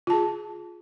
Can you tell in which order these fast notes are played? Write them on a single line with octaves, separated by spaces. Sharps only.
F4 A5 G#4